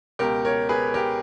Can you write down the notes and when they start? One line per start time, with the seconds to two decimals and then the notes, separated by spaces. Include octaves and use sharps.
0.19 C#2 B2 G4 A#4
0.45 A#4 C#5
0.69 G#4 B4
0.94 G4 A#4